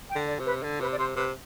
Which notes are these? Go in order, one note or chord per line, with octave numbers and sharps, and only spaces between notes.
G5
D3
D5
C3
B4
D3
C3 B4
D5
C3 C5
C3 B4